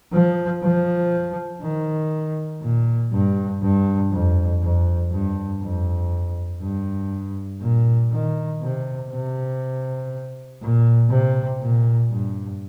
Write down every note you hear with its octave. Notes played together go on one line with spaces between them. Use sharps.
F3
F3
D#3
A#2
G2
G2
F2
F2
G2
F2
G2
A#2
D#3
C3
C3
A#2
C3
A#2
G2